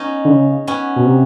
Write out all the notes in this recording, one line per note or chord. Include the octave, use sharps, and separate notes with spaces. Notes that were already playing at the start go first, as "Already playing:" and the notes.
Already playing: B3 C#4 D#4
D3
C#3
B3 C#4
B2
C3